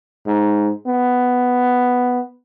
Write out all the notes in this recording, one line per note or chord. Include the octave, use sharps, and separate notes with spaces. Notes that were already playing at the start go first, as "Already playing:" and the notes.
G#2
B3